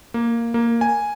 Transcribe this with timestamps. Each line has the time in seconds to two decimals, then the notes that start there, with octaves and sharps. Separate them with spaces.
0.14 A#3
0.54 A#3
0.81 G#5